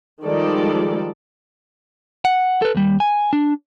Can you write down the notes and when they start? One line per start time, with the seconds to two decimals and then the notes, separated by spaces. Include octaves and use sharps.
0.25 D#3 F3 G3 G#3 A4 D5
2.25 F#5
2.62 A4 B4
2.75 D#2 G3
3.00 G#5
3.33 D4